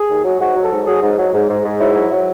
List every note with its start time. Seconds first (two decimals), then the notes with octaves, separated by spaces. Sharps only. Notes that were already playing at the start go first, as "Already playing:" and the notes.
Already playing: G#4
0.09 D#2
0.24 F#3
0.40 G#2 F#4
0.56 F#3
0.64 A4
0.71 G#2
0.86 F#3 G#4
1.02 G#2
1.18 F#3
1.33 G#2
1.49 G#2
1.65 G#2
1.80 F#3 E4
1.95 F#3
2.11 F#3